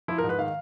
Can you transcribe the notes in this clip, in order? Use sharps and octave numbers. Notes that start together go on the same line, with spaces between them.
F3 E4
A#4
G#2
B4
D#3 F5